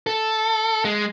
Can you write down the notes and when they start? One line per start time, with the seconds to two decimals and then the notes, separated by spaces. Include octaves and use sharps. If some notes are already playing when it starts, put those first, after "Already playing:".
0.07 A4
0.85 G#3